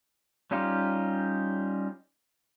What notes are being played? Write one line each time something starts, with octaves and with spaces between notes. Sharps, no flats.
G3 C#4 D#4 F4 G4